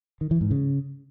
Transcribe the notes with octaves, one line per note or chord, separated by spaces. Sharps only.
D#3
E3
G#2
C#3